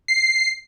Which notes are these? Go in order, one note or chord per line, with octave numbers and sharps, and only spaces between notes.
C7